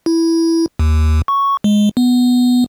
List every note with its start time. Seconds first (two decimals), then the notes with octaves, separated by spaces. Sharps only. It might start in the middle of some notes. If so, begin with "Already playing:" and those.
0.06 E4
0.79 D#2
1.28 C#6
1.64 G#3
1.97 B3